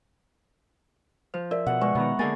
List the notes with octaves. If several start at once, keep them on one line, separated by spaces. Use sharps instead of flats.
F3 C5
A#4 D5 E5
B2 F#5
G#3 B4 D5 C#6
B2 D#3 B3 A#5
D3 A#3 G#4 G#5 A6